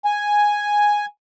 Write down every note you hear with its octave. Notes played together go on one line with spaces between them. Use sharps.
G#5